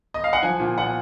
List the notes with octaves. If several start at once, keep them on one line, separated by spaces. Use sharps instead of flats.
D#5
F5
F#5
F3 G#5
A#2
A#2 F#5